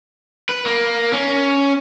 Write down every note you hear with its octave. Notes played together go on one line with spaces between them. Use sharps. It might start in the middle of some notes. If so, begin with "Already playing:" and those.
B4
A#3
C#4